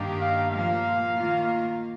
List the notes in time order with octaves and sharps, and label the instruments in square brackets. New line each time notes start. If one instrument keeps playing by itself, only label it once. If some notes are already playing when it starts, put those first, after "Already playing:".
Already playing: [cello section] G2 D#3 A#3 D4 G4
[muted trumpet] F5
[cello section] A#2 F3 A#3 [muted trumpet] F5
[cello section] D#3 A#3 F4